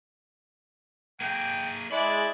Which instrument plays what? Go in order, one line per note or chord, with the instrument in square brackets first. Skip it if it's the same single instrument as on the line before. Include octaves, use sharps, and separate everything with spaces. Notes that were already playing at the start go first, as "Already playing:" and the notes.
[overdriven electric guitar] A#3 G#4 [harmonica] G5
[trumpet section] G#3 [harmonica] E4 D5 [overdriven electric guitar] B5